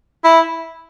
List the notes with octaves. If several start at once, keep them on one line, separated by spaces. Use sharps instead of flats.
E4